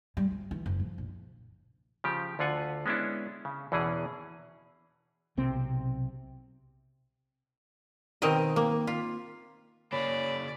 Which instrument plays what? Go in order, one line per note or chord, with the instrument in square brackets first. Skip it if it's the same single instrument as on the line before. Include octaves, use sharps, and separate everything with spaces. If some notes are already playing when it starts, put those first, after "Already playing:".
[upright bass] G3
F3
E3
F#1
F3
A#1
[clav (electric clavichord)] C#3 F3 G4
D2 D3 F4 F#5 G#5
G#3 B3 C#4 D4 E4
C#3
E2 B2 E3 C#4 G#4
[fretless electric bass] B1 C3 C4
[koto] B2 D#3 C4 A#4 D#5
A#3
F4
[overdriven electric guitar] C#3 A#3 [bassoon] C#4 [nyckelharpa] D5 [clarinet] B5